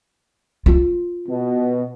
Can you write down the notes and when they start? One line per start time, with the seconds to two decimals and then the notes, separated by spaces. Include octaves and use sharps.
0.66 F4
1.29 B2